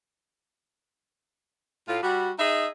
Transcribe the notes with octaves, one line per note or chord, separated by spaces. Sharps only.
A2 F4
G3 F#4
D#4 G#4 D#5 E5